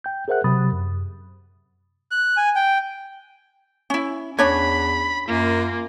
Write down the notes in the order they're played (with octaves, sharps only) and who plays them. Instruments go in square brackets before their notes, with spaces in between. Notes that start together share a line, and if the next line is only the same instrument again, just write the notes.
[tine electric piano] G5 G6
G#4 A#4 C5 E5 F#5 F#6
C3 F#3 B5 D#6 A6
F#2
[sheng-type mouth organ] F#6
G#5
G5
[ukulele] C#4 E4
[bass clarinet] E2 [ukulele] C#4 D4 C#5 [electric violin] B5
[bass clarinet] F#2 [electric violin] A#3 F4